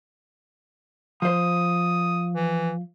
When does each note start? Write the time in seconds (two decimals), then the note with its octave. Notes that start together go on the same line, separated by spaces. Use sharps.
1.22 F3 C5 D#6
2.33 E3